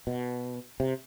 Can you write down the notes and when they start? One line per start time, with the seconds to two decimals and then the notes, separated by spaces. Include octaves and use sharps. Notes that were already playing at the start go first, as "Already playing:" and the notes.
0.07 B2
0.80 C3